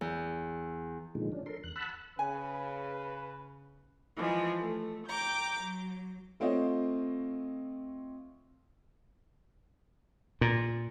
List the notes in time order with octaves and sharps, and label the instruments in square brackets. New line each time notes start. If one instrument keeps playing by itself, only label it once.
[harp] E2
[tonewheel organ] A#2 D3 D#3 F3 G#3
C#4 D4
A4 A#4 C6
E2 F#6
F#5 A5 B5 E6 F#6
[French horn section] C#3 [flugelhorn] B4 [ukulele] G#5
[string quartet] E3 F3 G#3
A3
G5 A#5 D6 G6
F#3
[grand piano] A3 C4 F4 C#5 D#5
[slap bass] A#2